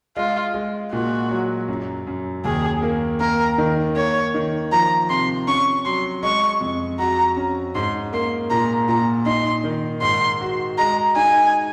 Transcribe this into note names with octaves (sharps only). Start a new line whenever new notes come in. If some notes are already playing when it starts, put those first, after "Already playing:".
G#3 F4
G#3
A#2 F#4
F#3
F#2
F#2
D#2 G#4
A#3
A#3 A#4
D#3
A#3 C#5
D#3
F3 A#5
C3 C6
C#4 C#6
F#3 C6
G#3 C#6
F2
F#4 A#5
C#4
G#2 C6
A#3 C6
A#2 A#5
A#2 A#5
D#4 C6
D#3
G#2 C6
F#4
G#3 A#5
D#4 G#5